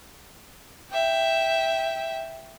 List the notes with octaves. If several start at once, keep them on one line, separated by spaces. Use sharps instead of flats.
E5 G5